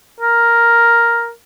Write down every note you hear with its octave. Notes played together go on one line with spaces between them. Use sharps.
A#4